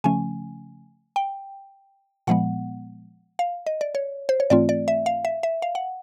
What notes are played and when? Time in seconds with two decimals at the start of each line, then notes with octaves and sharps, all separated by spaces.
0.04 C#3 F3 A3 C#4 G#5
1.16 G5
2.27 A#2 F3 G#3 B3 F#5
3.39 F5
3.66 D#5
3.81 D5
3.95 C#5
4.29 C5
4.40 C#5
4.50 G#2 E3 A3 C4 F4 D5
4.69 D5
4.88 E5
5.06 F5
5.25 E5
5.43 E5
5.62 F5
5.75 F#5